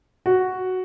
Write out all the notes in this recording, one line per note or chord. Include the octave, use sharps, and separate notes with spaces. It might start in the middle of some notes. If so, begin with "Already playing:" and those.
F#4